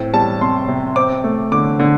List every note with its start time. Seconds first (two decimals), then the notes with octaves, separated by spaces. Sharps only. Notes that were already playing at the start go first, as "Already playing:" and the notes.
Already playing: A2 C4
0.14 G3 A5
0.41 C3 C6
0.68 C3
0.96 C4 D6
1.24 A3
1.52 D3 D6
1.79 D3